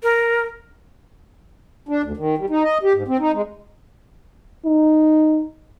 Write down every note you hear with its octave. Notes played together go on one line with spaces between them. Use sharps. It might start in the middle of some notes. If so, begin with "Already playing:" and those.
A#4
D4
D2
D#3
G3
D#4
D#5
G4
G#2
C4
D#4
G#3
D#4